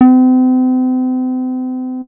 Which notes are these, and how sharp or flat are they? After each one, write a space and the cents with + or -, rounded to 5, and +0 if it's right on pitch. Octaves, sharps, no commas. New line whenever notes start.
C4 -40